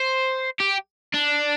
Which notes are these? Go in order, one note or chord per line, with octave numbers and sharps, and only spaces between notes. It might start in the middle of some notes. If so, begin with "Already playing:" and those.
Already playing: C5
G4
D4